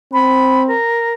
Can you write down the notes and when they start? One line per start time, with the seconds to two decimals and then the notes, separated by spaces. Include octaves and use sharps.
0.12 C4 B5
0.67 A#4